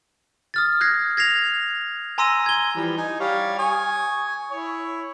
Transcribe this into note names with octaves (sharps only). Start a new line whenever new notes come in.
D#6 F6 A6
F#6 G#6 A#6 C7
G#6 A#6 C7 F7
G#5 A#5 C6 E6 A#6 D#7
G#6 G7
E3 F3 G3
D#4 G#5
G3 C#5 F5
G#5 C#6 D#6
E4 C#5